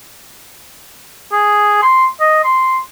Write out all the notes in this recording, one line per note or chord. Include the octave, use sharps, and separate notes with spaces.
G#4
C6
D#5
C6